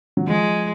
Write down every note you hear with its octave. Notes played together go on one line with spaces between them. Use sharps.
F#3
F3 G#3